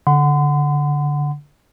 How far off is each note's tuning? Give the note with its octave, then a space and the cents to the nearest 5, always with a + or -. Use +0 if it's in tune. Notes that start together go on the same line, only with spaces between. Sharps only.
D3 -15 F#5 +0 C6 -40